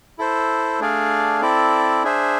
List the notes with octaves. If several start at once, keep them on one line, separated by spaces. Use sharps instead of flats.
E4 A4 C5
A3 D4 G#4 D5 F5
C4 E4 A4 D5
D4 G#4 C5 E5